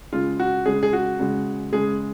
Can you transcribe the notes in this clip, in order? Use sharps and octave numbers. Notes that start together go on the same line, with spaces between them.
C#3 G#3 F4
F#4
C#3 G#3 G#4
G#4
F#4
C#3 G#3
C#3 G#3 G#4